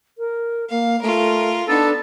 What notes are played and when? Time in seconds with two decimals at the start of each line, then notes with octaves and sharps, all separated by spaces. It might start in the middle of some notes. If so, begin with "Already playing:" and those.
0.18 A#4
0.71 A#3 F5
1.02 A3 F4 A#4
1.68 B3 D4 D#4 A4